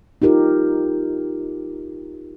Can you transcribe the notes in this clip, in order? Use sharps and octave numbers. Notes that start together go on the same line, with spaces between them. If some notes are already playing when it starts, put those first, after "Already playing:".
D#4 F4 G4 A#4